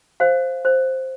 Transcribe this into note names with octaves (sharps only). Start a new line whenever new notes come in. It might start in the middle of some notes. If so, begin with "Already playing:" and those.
C5 F5
C5